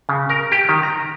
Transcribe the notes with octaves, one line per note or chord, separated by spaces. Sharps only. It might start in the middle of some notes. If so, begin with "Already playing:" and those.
C#3
A#4
G4
D#3
A#5